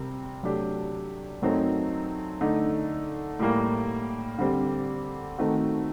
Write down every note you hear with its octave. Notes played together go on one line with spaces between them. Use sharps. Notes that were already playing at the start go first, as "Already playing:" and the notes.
Already playing: C3 G3 C4 A#4
C3 F#3 A3 D4 G4
F#2 F#3 A3 C4 D#4
D3 A3 D#4
A2 G3 A#3
D3 G3 C4 G4
D#3 A3 C4 D#4 F#4